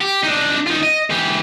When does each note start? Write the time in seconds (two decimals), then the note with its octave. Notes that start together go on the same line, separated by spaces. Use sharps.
0.01 G4
0.23 D4 D#4
0.67 D#4 F4
0.83 D#5
1.10 E3 G4